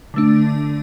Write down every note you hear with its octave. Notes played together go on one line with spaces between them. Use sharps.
D3 A3 D4